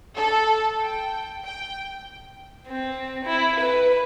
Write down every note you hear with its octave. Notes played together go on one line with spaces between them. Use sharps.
A4
G5
G5
C4
E4
B4